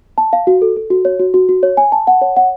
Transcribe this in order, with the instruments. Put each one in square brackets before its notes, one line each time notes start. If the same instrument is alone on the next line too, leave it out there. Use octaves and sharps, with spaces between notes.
[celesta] A5
F5
F#4
A4
A4
F#4
C#5
F#4
F#4
F#4
C#5
G#5
A5
F#5
C#5
F#5